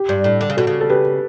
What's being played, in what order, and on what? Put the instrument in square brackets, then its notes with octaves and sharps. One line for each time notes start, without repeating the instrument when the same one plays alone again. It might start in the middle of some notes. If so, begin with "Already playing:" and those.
Already playing: [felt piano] G4
[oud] G2
A2
D3
C#3
[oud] B2 [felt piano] F#4 A4
[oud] C#3
[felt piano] A4
G4 B4